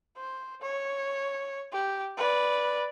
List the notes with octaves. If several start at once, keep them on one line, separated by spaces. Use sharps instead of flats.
C5
C#5
G4
B4 D5